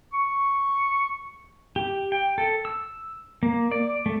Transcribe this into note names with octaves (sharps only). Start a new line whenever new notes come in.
C#6
G4
G5
A4
E6
A#3
D5
A3